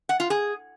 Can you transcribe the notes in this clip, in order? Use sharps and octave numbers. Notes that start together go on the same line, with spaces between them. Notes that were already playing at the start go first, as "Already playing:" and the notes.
F#5
F4
G#4